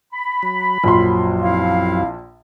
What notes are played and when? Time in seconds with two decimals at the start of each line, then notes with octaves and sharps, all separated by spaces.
0.13 B5
0.43 F#3
0.84 A#1 F#2 A#2 F3 F#3 C6
1.42 C4 E4 F5